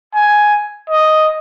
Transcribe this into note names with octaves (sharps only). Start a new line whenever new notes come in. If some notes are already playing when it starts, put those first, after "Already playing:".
G#5
D#5